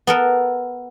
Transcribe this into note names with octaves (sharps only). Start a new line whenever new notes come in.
B3 A4 A#4